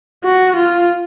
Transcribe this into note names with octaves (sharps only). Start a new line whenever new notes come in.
F#4
F4